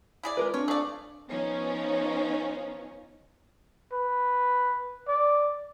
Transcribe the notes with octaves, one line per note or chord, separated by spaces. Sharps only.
E4 G#4 D5
G#3 F4 A#4 B4
A3 C4 D4 F4 C#5
A3 G#4 D5 F5 C#6
F3 B3 C#4 D#4
B4
D5